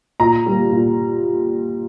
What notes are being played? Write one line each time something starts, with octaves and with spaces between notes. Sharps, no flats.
A#2 A#5
G3 A#3
A#2